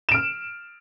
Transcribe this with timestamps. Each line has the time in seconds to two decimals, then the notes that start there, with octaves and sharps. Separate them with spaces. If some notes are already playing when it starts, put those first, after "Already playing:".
0.09 E7
0.12 D7
0.14 F6